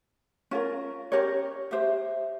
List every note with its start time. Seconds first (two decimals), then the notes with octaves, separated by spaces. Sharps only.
0.51 C#4 F4 A#4
1.12 C#4 G4 A#4 C#5
1.71 G4 C5 E5